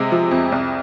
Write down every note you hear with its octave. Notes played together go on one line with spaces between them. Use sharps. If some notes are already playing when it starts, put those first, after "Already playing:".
Already playing: C3 G#3
F3
F2
C2